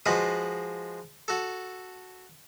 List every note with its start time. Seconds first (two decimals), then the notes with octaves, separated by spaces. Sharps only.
0.06 F3 G#3 F4 F#4 B4 D#5
1.28 F#4 A4